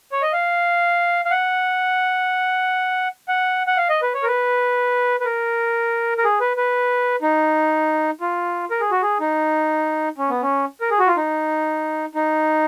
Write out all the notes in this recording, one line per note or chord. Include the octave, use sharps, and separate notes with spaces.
C#5
D#5
F5
F5
F#5
F#5
F#5
F5
D#5
B4
C#5
A#4
B4
B4
A#4
A#4
G#4
B4
B4
D#4
F4
A#4
G#4
F#4
G#4
D#4
C#4
B3
C#4
A#4
G#4
F#4
F4
D#4
D#4